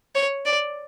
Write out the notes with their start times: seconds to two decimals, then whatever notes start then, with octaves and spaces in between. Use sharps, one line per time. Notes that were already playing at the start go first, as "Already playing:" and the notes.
0.15 C#5
0.45 D5